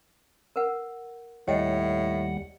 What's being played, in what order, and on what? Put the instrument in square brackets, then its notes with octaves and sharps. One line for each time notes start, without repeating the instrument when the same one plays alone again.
[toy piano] A#4 B4 F#5
[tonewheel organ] D#2 G3 F#5 [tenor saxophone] A2 [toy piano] C#5 D#5 G5